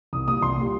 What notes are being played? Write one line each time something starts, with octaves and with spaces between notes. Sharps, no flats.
C2 D#6
A#2 G3 D#6
C2 C6
A#2 G3